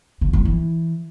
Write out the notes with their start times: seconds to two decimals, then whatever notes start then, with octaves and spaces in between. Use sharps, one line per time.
0.21 C#3
0.33 G2
0.45 E3